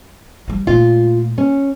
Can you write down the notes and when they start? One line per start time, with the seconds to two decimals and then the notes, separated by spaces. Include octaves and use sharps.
0.48 F3 G3
0.67 A#2 A3 F4
1.38 C#4